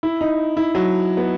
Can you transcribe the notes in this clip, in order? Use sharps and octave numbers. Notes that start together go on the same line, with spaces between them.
E4
D#4
E4
F#3
B3